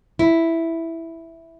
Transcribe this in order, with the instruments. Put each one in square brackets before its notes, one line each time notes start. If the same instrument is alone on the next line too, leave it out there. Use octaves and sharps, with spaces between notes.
[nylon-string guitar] E4